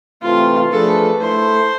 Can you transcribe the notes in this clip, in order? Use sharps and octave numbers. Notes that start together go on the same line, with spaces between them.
C3 E3 A3 C4 F4
F3 A3 D4 G#4 A4 B4
A3 E4 A4 C5